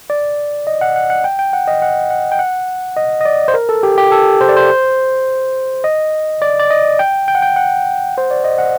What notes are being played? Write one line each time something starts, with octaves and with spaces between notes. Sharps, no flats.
D5
D#5
F#5
F#5
F#5
G5
G5
F#5
D#5
F#5
F#5
G5
F#5
D#5
D#5
D5
C5
A#4
A4
G4
G4
A4
C5
D5
C5
D#5
D5
D5
D#5
G5
G5
F#5
G5
F#5
C5
D5
D#5
F#5